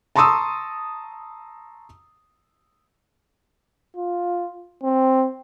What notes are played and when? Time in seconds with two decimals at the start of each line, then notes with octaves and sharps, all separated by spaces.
0.16 A5 A#5 C6 C#6 D#6 E6
3.97 F4
4.83 C4